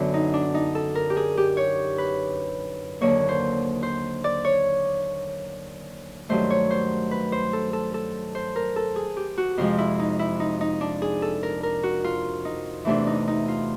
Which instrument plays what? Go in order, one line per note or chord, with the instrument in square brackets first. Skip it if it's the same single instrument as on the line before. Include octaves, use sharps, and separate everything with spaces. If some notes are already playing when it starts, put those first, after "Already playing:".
Already playing: [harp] F#2 D3 F#3 B3
D#4
D4
D#4
A4
A#4
G4
G#4
G4
C#5
B4
D#2 D3 F#3 A#3 C#5
C5
C5
D5
C#5
G2 D#3 F#3 A3 C5
C#5
C5
B4
C5
A4
A4
A4
C5
A#4
A4
G#4
G4
F#4
F2 C3 F3 G#3 F4
E4
D#4
E4
D#4
D#4
D4
G#4
A4
A#4
A#4
F#4
F4
D#4
E2 C3 E3 A3 D4
D#4
D#4
F4